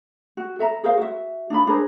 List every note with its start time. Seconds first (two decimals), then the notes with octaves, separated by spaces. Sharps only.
0.37 F#4
0.59 A4 E5 A#5
0.83 G#4 A#4 C5 F5
0.97 F#4 E5
1.50 D4 D#4 F4 B5
1.67 D4 G#4 A#4 C5